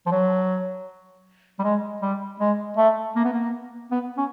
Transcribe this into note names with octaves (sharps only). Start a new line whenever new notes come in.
F3
F#3
G3
G#3
G3
G#3
A3
A#3
B3
A#3
B3
C#4